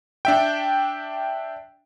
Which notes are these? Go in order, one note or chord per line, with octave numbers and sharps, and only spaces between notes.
D4 E5 G5